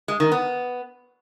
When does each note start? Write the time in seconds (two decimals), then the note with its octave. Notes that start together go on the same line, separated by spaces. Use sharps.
0.08 G#3
0.20 D#3
0.32 B3